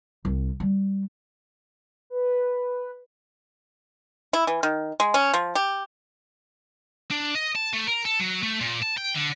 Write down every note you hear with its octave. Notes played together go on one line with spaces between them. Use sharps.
C2
G3
B4
E4
E3
D#3
G#3
C#4
F3
G4
D4
D#5
A5
A3
A#4
A4
F#3
A3
A#2
A5
G5
D3